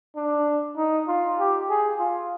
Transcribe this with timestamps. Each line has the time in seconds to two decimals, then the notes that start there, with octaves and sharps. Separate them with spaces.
0.16 D4
0.77 D#4
1.07 F4
1.39 G4
1.70 G#4
1.99 F4